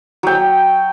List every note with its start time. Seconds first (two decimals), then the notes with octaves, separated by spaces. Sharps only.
0.23 F#3 G5